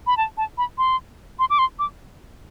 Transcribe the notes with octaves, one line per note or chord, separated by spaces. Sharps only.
B5
A5
A5
B5
C6
C6
D6
C6
D6